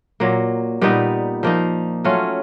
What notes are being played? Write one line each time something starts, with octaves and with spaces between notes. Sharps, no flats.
A#2 F#3 A#3
A#2 G3 B3 D#4
F3 A#3 D#4
F#3 A3 C#4 F4